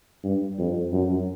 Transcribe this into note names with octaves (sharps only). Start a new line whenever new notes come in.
G2
F2
F#2